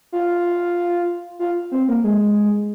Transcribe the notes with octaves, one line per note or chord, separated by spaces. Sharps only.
F4
F4
C4
A#3
G#3